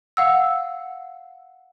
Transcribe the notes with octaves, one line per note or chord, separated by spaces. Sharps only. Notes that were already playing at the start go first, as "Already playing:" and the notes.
F5 F#5 E6